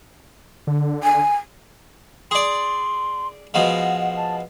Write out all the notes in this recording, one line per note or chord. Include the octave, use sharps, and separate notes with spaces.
D3
G#5
G#4 D5 C6
B2 F3 G#3 F#5
A5